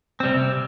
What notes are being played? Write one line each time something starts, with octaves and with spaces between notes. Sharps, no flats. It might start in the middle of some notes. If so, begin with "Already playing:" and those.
C3 G3 C4